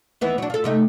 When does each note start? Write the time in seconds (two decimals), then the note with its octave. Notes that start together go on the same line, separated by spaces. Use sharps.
0.21 D#2 E3 B3
0.38 F#3 D4
0.50 F4 A4
0.64 C3 A3 D#4